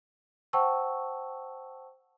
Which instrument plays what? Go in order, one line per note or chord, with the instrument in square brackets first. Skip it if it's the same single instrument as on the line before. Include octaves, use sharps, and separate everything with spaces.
[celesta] C5 F#5 G5 A5 C#6 E6